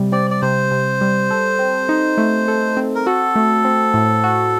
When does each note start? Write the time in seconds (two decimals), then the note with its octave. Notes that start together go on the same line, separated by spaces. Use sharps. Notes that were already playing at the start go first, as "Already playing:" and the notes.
Already playing: C3 G3
0.12 C4 D5
0.31 D5
0.42 C3 C5
0.71 C3
1.01 G3
1.31 A4
1.59 C4
1.89 D#4
2.18 A3
2.48 A4
2.77 C4
2.95 A#4
3.06 F#4 A4
3.35 A3
3.65 C4
3.94 A2
4.24 F#4